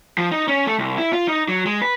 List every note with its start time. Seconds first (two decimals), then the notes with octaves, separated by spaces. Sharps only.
0.18 F3
0.31 D#4
0.48 C#4
0.67 A3
0.79 C2
0.98 E4
1.13 F4
1.28 D#4
1.48 F#3
1.66 G#3
1.82 B4